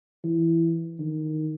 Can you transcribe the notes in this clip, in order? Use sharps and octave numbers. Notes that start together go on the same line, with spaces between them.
E3
D#3